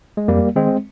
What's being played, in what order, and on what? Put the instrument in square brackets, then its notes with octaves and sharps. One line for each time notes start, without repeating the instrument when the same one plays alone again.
[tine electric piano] G#3
F2 G3 A#3
D#3 G#3 C4